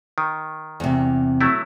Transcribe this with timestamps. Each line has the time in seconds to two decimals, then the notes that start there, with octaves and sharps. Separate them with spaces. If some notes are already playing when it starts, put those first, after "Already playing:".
0.18 D#3
0.80 E2 C3
1.41 F#3 A3 E4